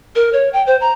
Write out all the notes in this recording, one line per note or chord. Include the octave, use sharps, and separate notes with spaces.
A#4
C#5
G5
C5
A#5